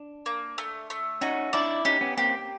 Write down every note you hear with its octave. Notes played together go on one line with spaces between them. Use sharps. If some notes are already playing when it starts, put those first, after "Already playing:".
Already playing: D4
A#3
A3
A3
C#4 D#4 F#4
D4 E4 D5
C#4 D#4 G4
B3 C#4
A#3 C4 G4